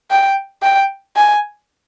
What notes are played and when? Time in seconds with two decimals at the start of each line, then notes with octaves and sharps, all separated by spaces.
0.11 G5
0.62 G5
1.16 G#5